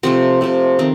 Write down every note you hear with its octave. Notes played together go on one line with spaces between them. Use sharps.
C3 F3 A3 C4
C3 F3 A3
D#3 C4